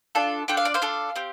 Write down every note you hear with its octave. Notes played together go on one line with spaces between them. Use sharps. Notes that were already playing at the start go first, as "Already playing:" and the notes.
D4 F4 A4
D4 F4 A4 G5
F5
D5
C5 F5
D4 F4 A4
C4 G4